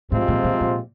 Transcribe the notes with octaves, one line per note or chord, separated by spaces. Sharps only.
A2 C3 F3 G#3 C4 F4
A#2
A#2
A#2